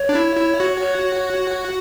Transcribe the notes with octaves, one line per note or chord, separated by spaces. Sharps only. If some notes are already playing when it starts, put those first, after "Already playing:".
Already playing: C#5
D4
E4
E4
F#4
C#5